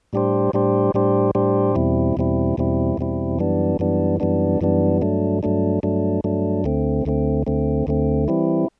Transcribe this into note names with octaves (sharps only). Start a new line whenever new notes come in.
A2 G3 D4 G4 C5
A2 G3 D4 G4 C5
A2 G3 D4 G4 C5
A2 G3 D4 G4 C5
E2 B2 G3 C4 E4
E2 B2 G3 C4 E4
E2 B2 G3 C4 E4
E2 B2 G3 C4 E4
F#2 E3 G3 B3 D4
F#2 E3 G3 B3 D4
F#2 E3 G3 B3 D4
F#2 E3 G3 B3 D4
G2 F#3 A3 D4
G2 F#3 A3 D4
G2 F#3 A3 D4
G2 F#3 A3 D4
D2 D3 A3 C4
D2 D3 A3 C4
D2 D3 A3 C4
D2 D3 A3 C4
E3 G3 C4 E4